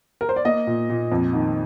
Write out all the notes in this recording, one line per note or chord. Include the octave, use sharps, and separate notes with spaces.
A#4
C5
D5
A#3 D#5
A#2
A#2
F2
D#3